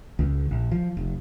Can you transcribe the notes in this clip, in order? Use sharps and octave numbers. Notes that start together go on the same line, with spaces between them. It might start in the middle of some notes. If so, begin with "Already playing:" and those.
C#2
A#1
F3
F1